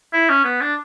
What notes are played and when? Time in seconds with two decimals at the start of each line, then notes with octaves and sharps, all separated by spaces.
0.13 E4
0.29 C#4
0.44 B3
0.61 D4